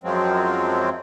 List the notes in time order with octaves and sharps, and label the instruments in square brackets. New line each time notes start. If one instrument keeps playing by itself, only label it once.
[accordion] F#2 F3 F#3 G#3 C4